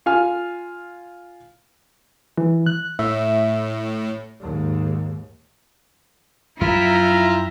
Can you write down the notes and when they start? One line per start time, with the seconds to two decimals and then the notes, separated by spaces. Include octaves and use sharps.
0.06 F4 F5 G#5 F6
2.38 E3
2.66 F#6
2.99 A2 E5
4.40 D#2 G#2
6.61 F#2 F3 F#3 E4 F4 E5 G5 A#5